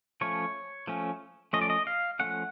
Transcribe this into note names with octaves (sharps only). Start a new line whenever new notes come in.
F3 A3 C#4 C#5
F3 A3 C#4
F3 A3 C#4 D#5
D5
D#5
F5
F3 A3 C#4 F#5